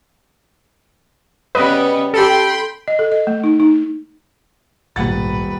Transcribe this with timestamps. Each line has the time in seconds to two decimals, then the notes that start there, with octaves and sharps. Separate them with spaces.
1.55 C#3 G3 B3 B4 D#5
2.14 G4 A4 G5 B5 C6
2.88 D#5
2.99 A4
3.12 D#5
3.27 A3
3.44 D#4
3.60 D#4
4.96 D#1 A#1 G#2 B2 B4 F#5 A6